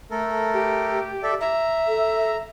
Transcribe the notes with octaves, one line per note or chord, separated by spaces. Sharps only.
A3 A4 A#4
G4
A4 D5 E5
E5 A#5
A4